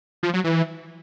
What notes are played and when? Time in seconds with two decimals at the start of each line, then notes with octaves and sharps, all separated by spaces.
0.23 F3
0.33 F#3
0.44 E3